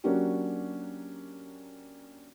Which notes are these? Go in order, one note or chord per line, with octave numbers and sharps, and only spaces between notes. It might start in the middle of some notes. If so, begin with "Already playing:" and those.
F#3 A#3 C#4 D4 F#4 G4